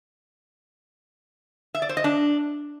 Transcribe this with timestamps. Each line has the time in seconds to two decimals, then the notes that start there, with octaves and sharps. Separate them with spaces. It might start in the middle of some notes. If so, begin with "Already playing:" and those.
1.75 E5
1.82 D5
1.89 C5
1.97 D#5
2.04 D4